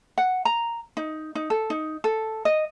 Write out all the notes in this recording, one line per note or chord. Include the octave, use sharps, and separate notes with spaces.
F#5
A#5
D#4
D#4
A4
D#4
A4
D#5